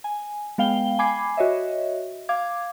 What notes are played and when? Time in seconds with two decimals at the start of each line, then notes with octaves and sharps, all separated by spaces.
0.04 G#5
0.58 G#3 B3 F5 G5 G7
0.99 G#5 B5 D6 G#6 C7
1.37 F#4 C#5 D#5 E5
2.29 F5 D6 G#6